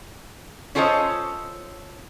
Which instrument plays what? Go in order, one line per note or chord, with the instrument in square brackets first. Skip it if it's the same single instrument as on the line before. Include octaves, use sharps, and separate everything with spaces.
[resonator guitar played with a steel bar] C#4 F4 A4 C5 C#5 D#5